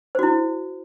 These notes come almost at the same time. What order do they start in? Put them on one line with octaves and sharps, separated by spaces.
C5 F#4 E4